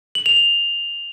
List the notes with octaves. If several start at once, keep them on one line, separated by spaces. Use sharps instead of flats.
F#7
F7
F7